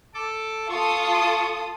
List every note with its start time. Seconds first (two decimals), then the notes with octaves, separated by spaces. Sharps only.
0.14 A4 D6
0.69 F4 A4 C#6 D#6